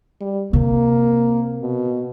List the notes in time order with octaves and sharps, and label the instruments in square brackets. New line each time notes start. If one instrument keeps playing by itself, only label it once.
[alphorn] G3
[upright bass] C3 [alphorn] A#3
[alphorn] B2